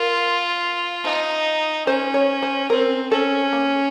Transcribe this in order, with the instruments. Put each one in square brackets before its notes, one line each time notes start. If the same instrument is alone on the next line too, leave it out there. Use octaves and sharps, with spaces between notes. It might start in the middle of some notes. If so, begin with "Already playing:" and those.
Already playing: [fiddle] F4 [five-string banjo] A#4
[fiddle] D#4
[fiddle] C#4 [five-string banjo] C5
[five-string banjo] C#5
C5
[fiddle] C4 [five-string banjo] A#4
[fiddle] C#4 [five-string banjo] A4
[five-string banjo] A#3